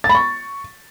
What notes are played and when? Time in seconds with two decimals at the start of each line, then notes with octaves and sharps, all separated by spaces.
0.04 A6
0.09 B5
0.15 C#6